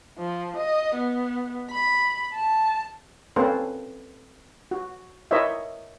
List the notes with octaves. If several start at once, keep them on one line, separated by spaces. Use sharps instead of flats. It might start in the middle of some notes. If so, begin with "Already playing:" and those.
F3
D#5
B3
B5
A5
A#3 C4 C#4 A4 B4 C5
F#4
E4 A#4 C5 C#5 D#5 E5